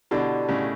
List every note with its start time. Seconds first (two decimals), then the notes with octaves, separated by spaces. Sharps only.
0.11 B2 D3 E4 G4 D5 F#5 A5
0.48 A2 C#3